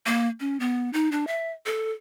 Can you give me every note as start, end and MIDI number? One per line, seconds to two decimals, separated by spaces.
0.06 0.28 58
0.40 0.59 61
0.60 0.92 59
0.93 1.09 63
1.12 1.27 62
1.27 1.51 76
1.66 1.91 69